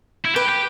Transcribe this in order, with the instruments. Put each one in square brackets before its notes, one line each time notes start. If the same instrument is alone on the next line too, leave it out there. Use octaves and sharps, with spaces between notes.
[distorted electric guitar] E4
[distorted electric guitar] G4 [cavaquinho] B4
[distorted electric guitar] G4